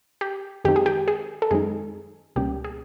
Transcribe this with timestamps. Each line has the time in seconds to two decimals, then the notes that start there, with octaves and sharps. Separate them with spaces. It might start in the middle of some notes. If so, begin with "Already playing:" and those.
0.21 G4
0.64 F#2 D#3 G#3 C4 D#4 G4
0.76 G#4
0.86 G4
1.08 G#4
1.42 A4
1.51 F#2 D#3 G#3 C4 D#4 G#4
2.36 C#2 B2 G3 A#3 C#4 G4
2.64 G#4